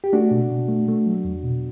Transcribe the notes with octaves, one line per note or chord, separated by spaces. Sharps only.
G4
A3 D4 F#4
B2
B2
A3
A3
F#3
E2
B2